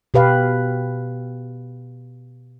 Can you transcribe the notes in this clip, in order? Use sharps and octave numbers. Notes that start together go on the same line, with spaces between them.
B2 G4 B4 F5